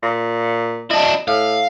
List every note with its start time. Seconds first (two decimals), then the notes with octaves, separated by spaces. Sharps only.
0.03 A#2
0.91 D4 E4 D#5
1.28 A2 F5